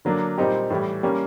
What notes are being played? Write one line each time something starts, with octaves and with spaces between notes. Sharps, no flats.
D3 F#3 A#3 D4
A#2 G3 C4 D#4 G4
A2 E3 G3
G3 A#3 C#4